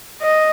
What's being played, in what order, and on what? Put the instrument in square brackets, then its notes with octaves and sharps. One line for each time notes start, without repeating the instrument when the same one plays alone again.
[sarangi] D#5